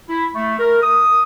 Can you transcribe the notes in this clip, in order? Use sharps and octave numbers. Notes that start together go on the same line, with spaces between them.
E4
A3
A#4
D#6